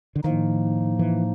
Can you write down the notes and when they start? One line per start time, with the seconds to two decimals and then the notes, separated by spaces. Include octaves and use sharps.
0.16 D3
0.24 A2 D#3 F3 A#3 D#4
0.99 E3